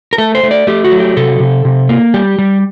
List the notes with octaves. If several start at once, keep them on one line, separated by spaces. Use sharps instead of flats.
A#4
A3 A4
C5
A3
D5
A3 G4
F#4
F#3
G4
C3 A4
C3
C3
A#3
G3 G4
G3